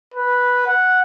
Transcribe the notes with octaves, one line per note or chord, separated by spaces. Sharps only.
B4
F#5